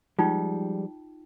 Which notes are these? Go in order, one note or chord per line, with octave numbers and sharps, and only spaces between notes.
F3 G3 G#3 D#4 F4 G5